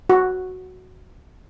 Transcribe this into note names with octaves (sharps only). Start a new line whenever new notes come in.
F#4